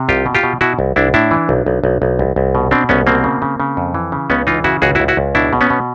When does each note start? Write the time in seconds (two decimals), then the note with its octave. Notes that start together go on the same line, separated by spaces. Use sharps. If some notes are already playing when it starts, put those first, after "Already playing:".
Already playing: C3
0.09 C2 F4 G4
0.26 B2
0.35 F4 G4
0.44 B2
0.61 B2 E4 F#4
0.79 C2
0.96 C2 D4 E4
1.14 A2 D4 E4
1.31 E3
1.49 B1
1.66 B1
1.84 B1
2.02 B1
2.19 C2
2.36 C2
2.55 B2
2.71 B2 C4 D4
2.89 C2 B3 C#4
3.07 B2 A#3 C4
3.24 C#3
3.42 C#3
3.60 C#3
3.77 F2
3.94 E3
4.12 C#3
4.30 C#2 B3 C#4
4.47 E3 D#4 F4
4.64 C#3 E4 F#4
4.82 C#2 F#4 G#4
4.95 E4 F#4
5.00 C#2
5.08 E4 F#4
5.17 C#2
5.35 B2 D4 E4
5.53 B2
5.61 B3 C#4
5.70 B2